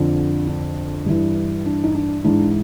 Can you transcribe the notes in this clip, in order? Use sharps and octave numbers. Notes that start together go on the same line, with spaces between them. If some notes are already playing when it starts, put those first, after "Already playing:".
Already playing: F2 D3 F3
D4
G2 E3
D4
D#4
D4
G#2 E3 D4